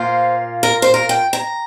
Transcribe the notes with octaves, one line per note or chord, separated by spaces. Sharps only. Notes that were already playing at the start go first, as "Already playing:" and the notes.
Already playing: A#2 A#3 F4 C5
A#4
C5
A#4
G5
A#5